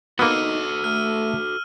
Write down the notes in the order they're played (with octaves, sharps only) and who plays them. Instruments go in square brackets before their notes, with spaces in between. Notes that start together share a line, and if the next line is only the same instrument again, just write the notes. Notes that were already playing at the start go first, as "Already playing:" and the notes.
[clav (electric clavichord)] A#3 B3 [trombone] D#4 [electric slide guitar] F#4 A4 [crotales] E6 F6 D#7
[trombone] A3 [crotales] F6